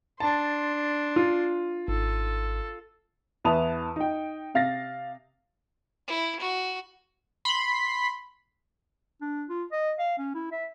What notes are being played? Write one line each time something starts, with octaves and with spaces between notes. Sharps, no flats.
D4 A5 C6
F4
G#1 A4
E2 E3 B4 A5 D#6 F7
D#4 G5
C3 F5 A6 A#6
E4
F#4
B5 C6
D4
F4
D#5
F5
C#4
E4
E5